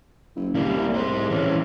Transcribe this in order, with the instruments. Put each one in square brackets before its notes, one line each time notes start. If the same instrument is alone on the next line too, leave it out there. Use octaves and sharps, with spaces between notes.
[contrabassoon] F#1
[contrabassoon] C2 [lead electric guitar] G3 A#3
[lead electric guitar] G#4 C5
E3 C#4